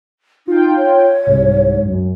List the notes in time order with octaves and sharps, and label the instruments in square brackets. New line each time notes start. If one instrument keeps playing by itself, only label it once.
[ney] D#4 [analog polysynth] F4 G5
[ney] C#5
[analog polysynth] C2 G#2
F#2